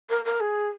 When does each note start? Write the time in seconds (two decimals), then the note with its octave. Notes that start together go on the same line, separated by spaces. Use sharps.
0.09 A#4
0.25 A#4
0.40 G#4